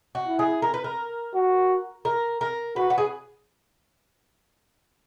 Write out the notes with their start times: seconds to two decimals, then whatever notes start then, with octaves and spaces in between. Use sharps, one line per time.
0.15 F#4
0.27 E4
0.39 G#4
0.62 A#4
0.74 B4
0.84 A#4
1.34 F#4
2.05 A#4
2.41 A#4
2.76 F#4 B4
2.90 F#4
2.98 G#4